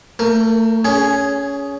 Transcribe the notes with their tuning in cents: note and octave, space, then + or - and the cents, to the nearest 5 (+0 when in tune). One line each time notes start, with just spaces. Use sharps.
A3 +30 A#4 +0
C#4 +20 G#4 +0